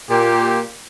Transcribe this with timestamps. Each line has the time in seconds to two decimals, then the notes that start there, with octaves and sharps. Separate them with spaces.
0.10 A#2 G4